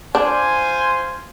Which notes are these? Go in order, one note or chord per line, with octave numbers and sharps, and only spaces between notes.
D4 F4 C5 G#5